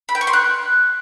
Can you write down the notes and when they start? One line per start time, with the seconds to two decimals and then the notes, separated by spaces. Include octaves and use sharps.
0.09 B5
0.15 G5
0.21 C#6
0.27 C6
0.33 F#6